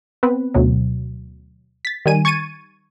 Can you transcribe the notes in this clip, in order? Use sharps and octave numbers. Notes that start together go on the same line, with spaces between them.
B3 C4 B4
D2 B2 F#3
A6 B6
D#3 G3 G#5 D#7
C#6 G#6 A6 C#7 D#7